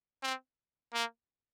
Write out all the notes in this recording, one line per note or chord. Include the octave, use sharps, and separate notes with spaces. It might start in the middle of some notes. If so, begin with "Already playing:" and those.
C4
A#3